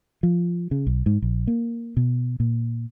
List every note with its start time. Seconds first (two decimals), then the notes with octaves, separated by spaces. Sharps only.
0.23 F3
0.71 C#3
0.87 B1
1.06 G#2
1.22 A#1
1.47 A#3
1.97 B2
2.40 A#2